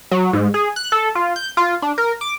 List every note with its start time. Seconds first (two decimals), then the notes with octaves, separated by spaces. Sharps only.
0.11 F#3
0.33 G#2
0.54 G#4
0.76 F#6
0.92 A4
1.15 F4
1.36 G6
1.57 F4
1.82 D4
1.98 A#4
2.21 D6